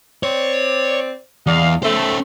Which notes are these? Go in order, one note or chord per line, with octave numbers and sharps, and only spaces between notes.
C4 C#5 D5
E2 D5 D#5 F5
A3 C#4 C5